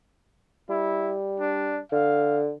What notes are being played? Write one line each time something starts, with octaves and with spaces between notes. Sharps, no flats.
G3 E4
D4
D3 F5